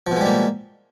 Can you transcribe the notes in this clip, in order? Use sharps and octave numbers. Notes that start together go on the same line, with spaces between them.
B2 F3 G3 G#3 A#3